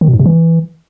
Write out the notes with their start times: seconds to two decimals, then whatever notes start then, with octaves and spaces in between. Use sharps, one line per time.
0.01 D#3
0.07 B2
0.13 G#2
0.20 C3
0.26 E3